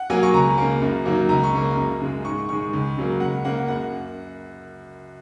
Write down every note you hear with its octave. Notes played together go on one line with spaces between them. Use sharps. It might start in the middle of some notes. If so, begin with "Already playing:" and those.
Already playing: F#5
F#3 A#3 G#5
C#6
C#2 A#5
C#3 A#3
F#2
D#3 F#3 A#3
C#2 A#5
C#6
C#3 A#3 A#5
F#2
C#3 G#3
G#2 C#6
D#3 G#3 C#6
C#2
C#3 F#3 A#3
C#2 F#5
C#3 A#3 F#5
F#2 F#5